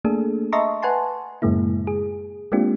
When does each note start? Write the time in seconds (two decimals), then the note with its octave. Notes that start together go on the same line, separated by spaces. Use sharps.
0.05 A3 A#3 D4 G#4 A4
0.52 D#5 E5 A5 A#5 C6 C#6
0.82 B4 F#5 G#5 A5 C6
1.42 F#2 A2 C#3 G#3 A#3 E4
1.87 G#4
2.52 G#3 A#3 C4 D4 F4 G4